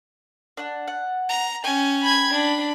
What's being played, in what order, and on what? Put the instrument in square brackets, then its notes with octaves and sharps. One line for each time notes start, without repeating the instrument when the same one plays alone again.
[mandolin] D4 F#5
F#5
[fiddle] A#5
[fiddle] C#4 G#5 [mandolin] G5
[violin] B5 G#6
[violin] D4 [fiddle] B5